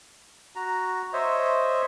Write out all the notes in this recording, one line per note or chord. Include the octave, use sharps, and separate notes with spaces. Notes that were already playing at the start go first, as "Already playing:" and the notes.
F#4 A#5
C5 C#5 D#5 E5